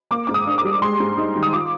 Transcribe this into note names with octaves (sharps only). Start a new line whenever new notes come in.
A#3 D6
G#2 D6
D#6
D4
D6
G3
G#3 C6
G#2
D#4
D#3
D#6
F4 D6